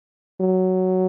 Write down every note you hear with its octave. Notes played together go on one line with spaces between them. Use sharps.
F#3